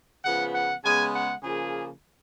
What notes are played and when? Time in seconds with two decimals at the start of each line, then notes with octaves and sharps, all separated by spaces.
0.25 C#3 F3 B3 F#5
0.54 F#5
0.84 C#3 G#3 B3 G#5
1.14 F#5
1.43 C#3 F3 A#3 G#4